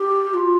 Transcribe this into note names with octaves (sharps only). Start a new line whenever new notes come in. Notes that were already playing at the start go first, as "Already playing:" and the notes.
Already playing: G4
G4
F4